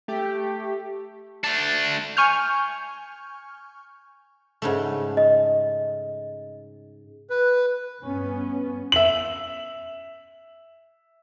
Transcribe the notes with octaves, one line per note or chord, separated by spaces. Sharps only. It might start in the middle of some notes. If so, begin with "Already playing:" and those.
A3 G4
A3 D4
G#5 C#6 F6 G6
G#2 C#3 A3
D#5
B4
G2 B3 C#4
E5 F#7